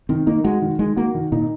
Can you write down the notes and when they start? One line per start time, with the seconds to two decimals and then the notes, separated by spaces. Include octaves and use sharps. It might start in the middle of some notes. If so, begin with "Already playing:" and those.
0.09 D#3 C4
0.27 A#3 D#4
0.44 G#3 F#4
0.62 D#3
0.79 D#3 G#3
0.96 A#3 F#4
1.14 D#3
1.32 A#2 D#4